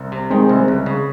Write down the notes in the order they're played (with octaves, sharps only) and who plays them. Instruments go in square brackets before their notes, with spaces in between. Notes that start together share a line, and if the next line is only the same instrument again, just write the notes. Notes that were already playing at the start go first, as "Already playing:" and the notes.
Already playing: [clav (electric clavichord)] C2
C3
[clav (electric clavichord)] D#3 [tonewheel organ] G#3 C4
[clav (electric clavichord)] C2
C#2
C#3